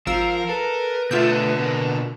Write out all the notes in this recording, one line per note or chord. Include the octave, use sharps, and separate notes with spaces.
G#1 F3 A#4 F5 E6
A4 B4
B2 D3 A3 F4 E5 G6
B2 A#3